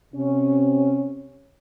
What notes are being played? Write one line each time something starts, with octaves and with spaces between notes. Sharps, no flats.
C3 C#4